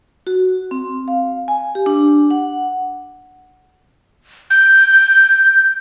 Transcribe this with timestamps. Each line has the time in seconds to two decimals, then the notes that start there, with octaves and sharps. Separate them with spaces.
0.27 F#4
0.71 C4
1.08 F5
1.48 G#5
1.75 G4
1.86 D4
2.30 F#5
4.50 G6